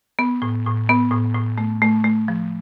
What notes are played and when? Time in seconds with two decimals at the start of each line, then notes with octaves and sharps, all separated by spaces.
0.19 B3
0.42 A2
0.66 A2
0.89 B3
1.11 A2
1.35 A2
1.58 A3
1.82 A3
2.04 A3
2.28 F3